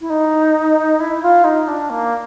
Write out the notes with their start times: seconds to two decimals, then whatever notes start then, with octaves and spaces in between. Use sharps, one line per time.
0.01 E4
0.09 D#4
0.99 E4
1.22 F4
1.44 D#4
1.67 D4
1.90 A#3